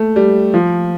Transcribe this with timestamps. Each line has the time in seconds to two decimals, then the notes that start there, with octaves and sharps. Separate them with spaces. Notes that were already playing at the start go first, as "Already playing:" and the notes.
Already playing: A3
0.16 G3
0.54 F3